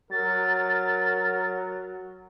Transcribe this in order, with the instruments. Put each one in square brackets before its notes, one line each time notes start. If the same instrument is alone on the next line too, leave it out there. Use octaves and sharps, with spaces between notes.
[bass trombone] F#3 [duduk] A#4 [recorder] A6